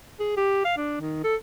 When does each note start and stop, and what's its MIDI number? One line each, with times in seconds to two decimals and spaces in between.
0.20 0.33 68
0.37 0.63 67
0.65 0.77 77
0.77 0.98 62
1.00 1.24 51
1.24 1.36 69